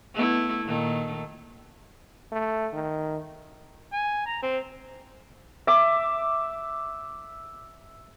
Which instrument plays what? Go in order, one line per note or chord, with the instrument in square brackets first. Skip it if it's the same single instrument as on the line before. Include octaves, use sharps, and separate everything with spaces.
[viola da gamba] A3 B3 E4
A#2 D#3 A3
[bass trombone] A3
D#3
[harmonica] G#5
A#5
C4
[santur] E5 D6